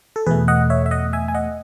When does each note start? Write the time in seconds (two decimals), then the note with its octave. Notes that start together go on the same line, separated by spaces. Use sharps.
0.16 A4
0.26 E2 B2 A3 G#4 B4
0.48 D#5 F#5
0.70 C#5 E5
0.86 E5
0.91 D#5 F#5
1.13 E5 G#5
1.28 G#5
1.34 D#5 F#5